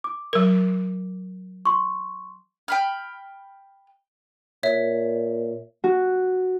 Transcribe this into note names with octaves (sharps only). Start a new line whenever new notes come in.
D6
F#3 A#4
C6 C#6
G5 B5 F6
A#2 C#5 E5
F#4